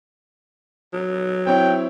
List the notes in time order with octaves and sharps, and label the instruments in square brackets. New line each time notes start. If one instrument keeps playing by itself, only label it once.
[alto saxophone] F#3
[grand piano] C4 E4 C#5 [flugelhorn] G5